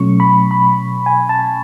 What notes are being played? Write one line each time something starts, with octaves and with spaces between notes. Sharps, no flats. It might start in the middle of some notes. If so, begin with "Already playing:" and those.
Already playing: B2 F#3 A3 C#4 C#6
B5
B5
G#5
A5